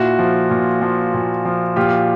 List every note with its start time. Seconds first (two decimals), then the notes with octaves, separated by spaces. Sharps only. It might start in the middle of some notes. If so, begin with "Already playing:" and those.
Already playing: A#2 E4 F#4
0.19 F3
0.50 A#2
0.82 F3
1.14 A#2
1.45 F3
1.76 A#2 F4 G4